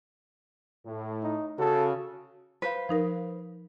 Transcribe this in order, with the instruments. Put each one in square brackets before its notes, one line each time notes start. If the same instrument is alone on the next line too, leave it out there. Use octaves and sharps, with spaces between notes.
[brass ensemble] A2
[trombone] D#4
[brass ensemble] C#3 F#4 [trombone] A4
[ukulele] B4 C5 F5
[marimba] F3 D#4 A#4